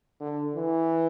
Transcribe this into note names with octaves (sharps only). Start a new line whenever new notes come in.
D3
E3